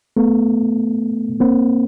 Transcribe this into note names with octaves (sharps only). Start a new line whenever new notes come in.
A3 B3
A#3 C4